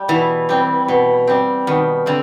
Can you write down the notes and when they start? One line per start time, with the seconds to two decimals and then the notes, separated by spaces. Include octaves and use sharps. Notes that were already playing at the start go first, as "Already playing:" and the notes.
Already playing: G3
0.08 B2 E3
0.49 G3 C4
0.88 B2
1.27 G3 C4
1.67 B2 D#3
2.06 D3 C4